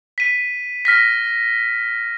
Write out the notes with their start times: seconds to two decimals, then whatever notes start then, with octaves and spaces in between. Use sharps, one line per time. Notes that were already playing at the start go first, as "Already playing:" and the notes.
0.18 B6 D#7
0.85 F6 A#6 B6